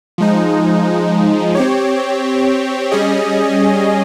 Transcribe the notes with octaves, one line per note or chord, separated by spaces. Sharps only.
F3 G#3 D#4
C4 G4 C#5
G3 C#4 G#4 D#5